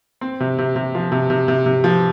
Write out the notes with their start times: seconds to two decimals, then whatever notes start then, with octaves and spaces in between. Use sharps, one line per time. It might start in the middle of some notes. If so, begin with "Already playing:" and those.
0.21 C4
0.40 C3
0.59 C3
0.76 C3
0.95 F3
1.12 C3
1.30 C3
1.48 C3
1.66 C3
1.84 F3